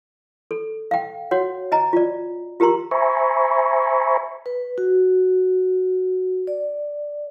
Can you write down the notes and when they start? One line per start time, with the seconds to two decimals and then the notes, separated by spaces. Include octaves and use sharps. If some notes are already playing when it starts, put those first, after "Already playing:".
0.51 A4
0.91 F5 G5
1.31 F#4 C#5 F#5
1.72 D#5 G#5 A#5
1.93 F4 D5
2.60 F4 G4 A#4 A#5 C6
2.91 C5 E5 G#5 A#5 B5 C#6
4.46 B4
4.78 F#4
6.47 D5